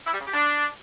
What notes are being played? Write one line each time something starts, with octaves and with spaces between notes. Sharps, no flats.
E4
G3
C#3
G4
D4